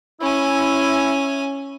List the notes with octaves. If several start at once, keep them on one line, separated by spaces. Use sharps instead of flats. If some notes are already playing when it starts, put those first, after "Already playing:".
C#4 E4 G#5